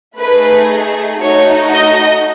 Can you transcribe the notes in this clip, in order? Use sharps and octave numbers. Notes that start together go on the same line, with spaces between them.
A3 D#4 G#4 B4
A3 D#4 F#4 C#5
D#5